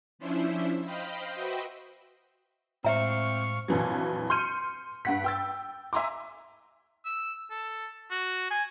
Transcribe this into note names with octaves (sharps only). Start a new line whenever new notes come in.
F3 C#4 D4 E4 C5 E5
C5 D#5 F5 G5 B5
F#4 B4 C5 D#5 E5 G5
A2 G#3 C4 E5 F5 A#5 C#6
A#1 F2 E3 F#3
C6 F6 G6 C#7 D#7
G2 F#5 B6
G5 E6 A6
E5 G#5 A#5 C6 D6
E6
A4
F#4
G#5